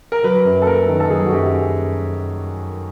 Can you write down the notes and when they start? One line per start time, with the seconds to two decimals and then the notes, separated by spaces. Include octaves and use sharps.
0.12 A#4
0.23 F#3 B4
0.45 F#2
0.62 A4
0.67 A#3 A#4
0.88 D#3
1.00 A4
1.10 F#3 G#4
1.26 F#4
1.32 F#2 G4